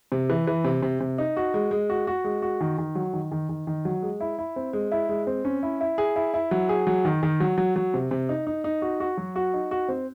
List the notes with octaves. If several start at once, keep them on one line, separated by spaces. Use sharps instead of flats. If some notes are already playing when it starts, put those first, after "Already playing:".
C3
E3
E3
C3
C3
C3
D#4
F#4
G#3
G#3
F#4
F#4
G#3
F#4
D#3
D#3
F#3
D#3
D#3
D#3
D#3
F#3
G#3
E4
E4
C4
G#3
E4
G#3
C4
C#4
E4
E4
G#4
E4
E4
F#3
G#4
F#3
D#3
D#3
F#3
F#3
F#3
C3
C3
D#4
D#4
D#4
F#4
F#4
F#3
F#4
D#4
F#4
C4